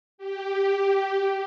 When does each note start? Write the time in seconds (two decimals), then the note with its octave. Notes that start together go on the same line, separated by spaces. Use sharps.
0.18 G4